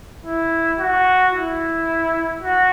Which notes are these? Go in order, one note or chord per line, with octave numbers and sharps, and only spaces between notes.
E4
F#4
E4
F#4